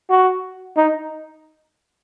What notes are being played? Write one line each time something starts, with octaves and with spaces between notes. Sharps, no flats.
F#4
D#4